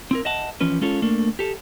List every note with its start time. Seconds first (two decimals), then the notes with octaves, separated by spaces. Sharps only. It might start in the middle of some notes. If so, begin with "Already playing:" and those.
0.11 C4 E4 A#4
0.25 D#5 E5 F#5 A5
0.61 E3 F3 C#4 B4
0.81 G#3 C#4 F4 A4 C#5
1.02 A3 A#3 D4
1.39 G4 A4